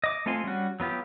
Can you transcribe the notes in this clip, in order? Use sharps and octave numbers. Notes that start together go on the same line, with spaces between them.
D#5 D6
A3 C4 F4 G#5 C6
G3 C#4 F#4
F#3 B3 F4 G4